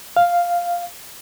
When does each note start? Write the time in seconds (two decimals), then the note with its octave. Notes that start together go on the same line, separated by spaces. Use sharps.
0.17 F5